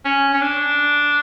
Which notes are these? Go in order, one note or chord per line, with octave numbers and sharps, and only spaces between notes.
C#4
C#4
D4